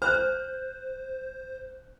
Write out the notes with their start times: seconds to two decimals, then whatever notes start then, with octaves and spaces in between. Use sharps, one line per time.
0.02 C5 F6 F#6